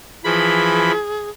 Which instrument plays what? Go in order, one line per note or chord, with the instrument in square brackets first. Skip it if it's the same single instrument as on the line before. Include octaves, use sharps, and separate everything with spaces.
[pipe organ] E3 F3 B5 [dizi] G#4